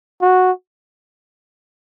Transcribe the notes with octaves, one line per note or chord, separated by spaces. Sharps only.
F#4